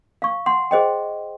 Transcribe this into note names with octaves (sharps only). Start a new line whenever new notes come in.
F5 C#6
F#5 C6
G#4 C5 D#5 G5